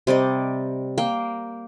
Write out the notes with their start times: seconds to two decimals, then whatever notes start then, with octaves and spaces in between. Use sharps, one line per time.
0.07 C3 G3 D5 D#5
0.98 A#3 G5